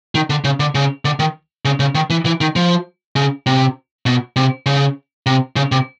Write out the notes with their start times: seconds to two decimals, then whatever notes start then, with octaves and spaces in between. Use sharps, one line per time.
0.15 D#3
0.30 D3
0.44 C#3
0.60 D3
0.75 C#3
1.05 D3
1.20 D#3
1.65 C#3
1.80 C#3
1.95 D#3
2.10 E3
2.26 E3
2.41 D#3
2.56 F3
3.16 C#3
3.46 C3
4.06 B2
4.36 C3
4.66 C#3
5.26 C3
5.56 C#3
5.72 C3